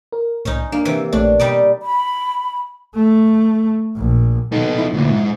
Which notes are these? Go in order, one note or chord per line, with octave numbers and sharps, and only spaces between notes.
A#4
C2 A2 C#4 D#4
A#3 D4
C3 E3
A#1 A3 D4 C#5
B2 G3 D#4 D5
B5
A3
A#1
B2 D#3 D#4 A4
F3 E4
D2 A#2
G#2